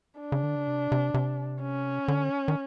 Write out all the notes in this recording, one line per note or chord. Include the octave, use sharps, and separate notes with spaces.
D4
C#3
D3
C#3
C3
C3
C3
C#4
D3
D#3